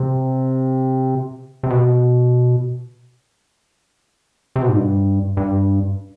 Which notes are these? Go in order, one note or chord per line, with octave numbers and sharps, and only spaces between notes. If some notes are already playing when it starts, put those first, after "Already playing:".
Already playing: C3
C3
B2
C3
B2
G#2
G2
G2